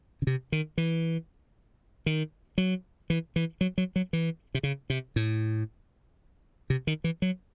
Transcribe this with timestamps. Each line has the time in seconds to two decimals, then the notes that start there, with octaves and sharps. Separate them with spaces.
0.22 C#3
0.27 C3
0.52 D#3
0.78 E3
2.06 D#3
2.58 F#3
3.10 E3
3.36 E3
3.61 F#3
3.78 F#3
3.96 F#3
4.13 E3
4.55 C3
4.63 C#3
4.90 C3
5.16 A2
6.70 C3
6.87 D#3
7.04 E3
7.22 F#3